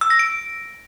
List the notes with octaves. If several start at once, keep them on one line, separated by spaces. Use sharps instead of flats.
E6
A#6
D7